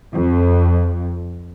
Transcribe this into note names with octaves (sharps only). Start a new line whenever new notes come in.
F2